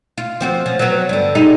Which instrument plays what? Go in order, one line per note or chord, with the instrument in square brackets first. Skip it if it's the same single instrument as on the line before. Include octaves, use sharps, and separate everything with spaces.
[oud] F4
F3 C4 F#4
F3 C#4
F#3 B3
G2 D3
G3 G#3 D#4